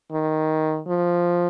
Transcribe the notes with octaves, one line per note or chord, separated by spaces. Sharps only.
D#3
F3